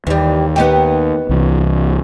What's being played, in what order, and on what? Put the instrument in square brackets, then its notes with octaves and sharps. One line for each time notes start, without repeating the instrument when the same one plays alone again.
[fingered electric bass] D#2 [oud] E3 G3
[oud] B3 D#4 G4
[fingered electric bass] C2 E3